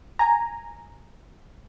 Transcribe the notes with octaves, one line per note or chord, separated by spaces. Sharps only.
G#5 A#5